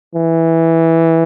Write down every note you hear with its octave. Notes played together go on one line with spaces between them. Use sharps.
E3